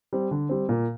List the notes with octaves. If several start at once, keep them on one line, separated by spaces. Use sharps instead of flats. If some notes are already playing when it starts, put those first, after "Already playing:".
G3 C4
D3
G3 C4
A#2